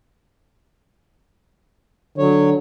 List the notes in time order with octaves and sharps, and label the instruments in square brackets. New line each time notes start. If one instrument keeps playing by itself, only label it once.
[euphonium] D3 [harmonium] F#3 C#5